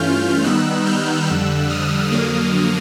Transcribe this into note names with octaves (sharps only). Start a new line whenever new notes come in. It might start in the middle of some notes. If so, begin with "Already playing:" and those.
Already playing: G2 E3 A3 C#4 F4 F6 G6
D#3 G3 B3 D#4 E6 F#6
F6 G6
F2 D3 G3 E6 F#6
D#6 F6
F2 D3 F#3 A#3